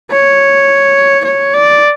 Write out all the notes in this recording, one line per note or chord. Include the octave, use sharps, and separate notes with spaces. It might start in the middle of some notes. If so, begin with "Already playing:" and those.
C#5
C#5
D5